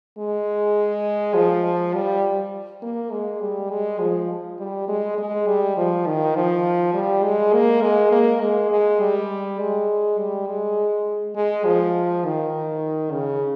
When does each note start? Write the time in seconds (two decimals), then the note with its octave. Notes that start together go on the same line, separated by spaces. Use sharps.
0.18 G#3
1.35 F3
1.94 G3
2.82 A#3
3.11 G#3
3.41 G3
3.70 G#3
4.00 F3
4.59 G3
4.88 G#3
5.18 G#3
5.47 G3
5.77 F3
6.06 D#3
6.35 F3
6.94 G3
7.23 G#3
7.53 A#3
7.82 G#3
8.11 A#3
8.41 G#3
8.71 G#3
9.00 G3
9.59 G#3
10.19 G3
10.47 G#3
11.35 G#3
11.65 F3
12.25 D#3
13.12 C#3